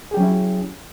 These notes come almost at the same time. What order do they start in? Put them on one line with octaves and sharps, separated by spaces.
G#4 G4 F#3 C#4 E4